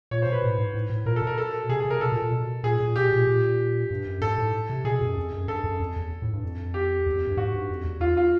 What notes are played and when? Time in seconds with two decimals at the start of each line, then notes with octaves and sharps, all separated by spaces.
0.11 A#2 C#5
0.22 B2 C5
0.32 B4
0.44 A2
0.58 G#2
0.75 A2
0.90 A2
1.06 A#2 A#4
1.16 A4
1.22 B2
1.27 A#4
1.38 A4
1.69 C3 G#4
1.80 G#4
1.85 C3
1.90 A#4
2.00 B2 A4
2.12 A#2
2.22 A#2
2.32 B2
2.63 A#2 G#4
2.80 A#2
2.95 B2 G4
3.11 A#2
3.27 A#2
3.91 G2
4.06 F#2
4.21 G#2 A4
4.38 A2
4.70 C3
4.85 B2 G#4
5.01 F#2
5.17 F2
5.32 F#2
5.48 G2 A4
5.64 F#2
5.80 F2
5.96 E2
6.22 A2
6.33 G2
6.43 F2
6.74 G4
7.06 E2
7.16 F2
7.27 G2
7.37 G#2 F#4
7.54 G2
7.69 F2
7.85 E2
8.00 E2 F4
8.17 F4